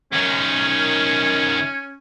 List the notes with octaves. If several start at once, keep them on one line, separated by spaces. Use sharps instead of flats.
F#2 D#3 C#4